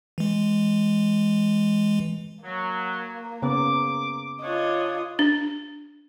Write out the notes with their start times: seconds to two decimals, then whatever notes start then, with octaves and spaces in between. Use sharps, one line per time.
0.18 E3 G#3
2.44 F#3 A#3
3.42 C#3 B3 D6
4.42 D4 F4 C#5 D#5
5.19 D4